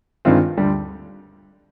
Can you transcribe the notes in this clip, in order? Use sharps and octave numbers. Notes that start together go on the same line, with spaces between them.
G2 D#3 G#3 C4 F4
D2 D3 G3